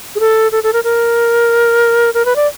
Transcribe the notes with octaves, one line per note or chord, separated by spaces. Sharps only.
G#4
A4
A4
A4
A#4
A#4
A#4
B4
D5